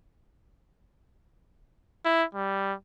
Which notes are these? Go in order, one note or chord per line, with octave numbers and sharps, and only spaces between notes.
E4
G3